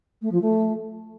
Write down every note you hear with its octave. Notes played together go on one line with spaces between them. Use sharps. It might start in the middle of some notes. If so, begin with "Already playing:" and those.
A3
F3
A3